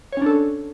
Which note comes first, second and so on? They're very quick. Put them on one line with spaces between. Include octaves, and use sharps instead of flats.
C#5 C#4 D4 A4